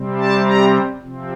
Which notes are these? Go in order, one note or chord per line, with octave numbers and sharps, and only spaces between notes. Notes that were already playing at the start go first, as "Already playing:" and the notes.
Already playing: C3 G3 C4
A5
A#5
C3 F3 C4